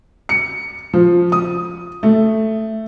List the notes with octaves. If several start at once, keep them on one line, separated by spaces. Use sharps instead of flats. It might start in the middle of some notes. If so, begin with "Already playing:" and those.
C#7
F3
D#6
A3